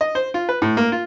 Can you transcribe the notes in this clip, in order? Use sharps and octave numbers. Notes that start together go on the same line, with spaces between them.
D#5
C5
F4
B4
A2
A#3
F4